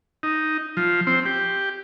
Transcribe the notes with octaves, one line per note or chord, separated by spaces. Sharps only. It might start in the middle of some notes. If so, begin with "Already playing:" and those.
D#4
F3
C4
G4